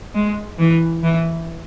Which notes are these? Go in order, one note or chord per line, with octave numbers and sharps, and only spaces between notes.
G#3
E3
E3